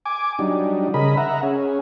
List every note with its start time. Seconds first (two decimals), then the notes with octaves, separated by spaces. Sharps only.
0.06 G#5 D6
0.39 F#3 G3 D4 D#4
0.94 C#3 G#4 A#4 D#5 B5
1.17 E5 F#5 A#5
1.43 C#4 G#4